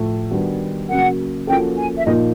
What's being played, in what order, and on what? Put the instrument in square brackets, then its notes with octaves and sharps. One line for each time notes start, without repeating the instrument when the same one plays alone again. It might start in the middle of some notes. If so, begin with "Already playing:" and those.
Already playing: [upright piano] A2 F3 A3
D#3 G3 B3 D4 F#4
[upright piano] C#3 F#3 A#3 [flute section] F#5
[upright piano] F3 A#3 C#4 F#4 A4 [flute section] G5
[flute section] G#5
E5
[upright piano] A#2 F3 A#3 D#4 [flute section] D#5